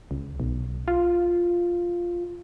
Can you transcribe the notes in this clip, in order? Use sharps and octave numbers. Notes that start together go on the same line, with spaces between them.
C#2
B1
F4